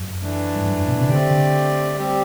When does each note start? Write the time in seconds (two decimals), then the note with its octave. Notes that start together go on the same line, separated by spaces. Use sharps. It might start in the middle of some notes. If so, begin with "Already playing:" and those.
Already playing: F#2
0.22 E3 A3 D4
0.55 G2
0.65 F#2
0.76 G2
0.88 B2
0.99 C3
1.09 D3 A3 C4 G4 D5
1.30 D3
1.97 G3 C4 G4